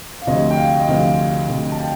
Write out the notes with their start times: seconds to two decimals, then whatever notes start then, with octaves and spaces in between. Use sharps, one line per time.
0.22 F5
0.27 D2 C3 F3 C4 D#5
0.51 G5
0.58 F5
0.80 D#5
0.88 D2 C3 F3 C4 F5
1.49 D2 C3 F3 C4
1.72 A5
1.80 G5